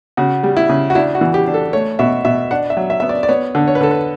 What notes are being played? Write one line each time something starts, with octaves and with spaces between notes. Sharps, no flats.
C#3 F#4
G3
E4
C#3
F#4
D4 E4
F#4
E3
G4
D4
A4
A3 C#5
B2 E5
B2 E5
D4 F#5
E5
F#3
E5
B3 E5
D5
D5
B3 C#5
D3
C#5
B4
D3 A4
B4